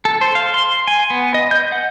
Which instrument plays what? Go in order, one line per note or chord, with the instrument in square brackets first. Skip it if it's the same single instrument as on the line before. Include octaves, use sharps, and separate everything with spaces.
[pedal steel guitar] A4
C5
F5
C6
G#5
B3
D#5
G6
F#5